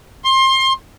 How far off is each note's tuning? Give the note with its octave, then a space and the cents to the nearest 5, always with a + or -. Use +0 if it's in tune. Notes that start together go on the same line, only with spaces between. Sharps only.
C6 +25